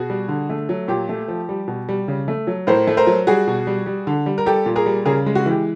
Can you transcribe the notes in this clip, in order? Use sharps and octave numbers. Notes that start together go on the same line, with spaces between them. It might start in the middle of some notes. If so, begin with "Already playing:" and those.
Already playing: B2 F#4 G#4
G3
D3
A3
F#3
A#2 G4
A3
F3
G3
B2
G3
C#3
A3
F#3
A2 A#4 C5
A3
A#4 C5
F#3
G3 F#4 G#4
B2
G3
G3
D3
G3
A#4
G3 G4 A4
A#2
G#4 A#4
G3
C#3 G#4 A#4
G#3
F#4
E3 G4